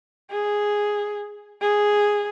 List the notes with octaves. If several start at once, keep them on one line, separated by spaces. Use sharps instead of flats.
G#4
G#4